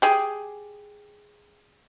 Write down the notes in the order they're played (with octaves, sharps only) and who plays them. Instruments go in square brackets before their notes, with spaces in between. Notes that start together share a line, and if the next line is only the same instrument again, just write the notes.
[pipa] G4 G#4